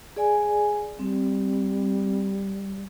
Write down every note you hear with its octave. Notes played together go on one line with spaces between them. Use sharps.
G#4 D5 G#5
G3 C4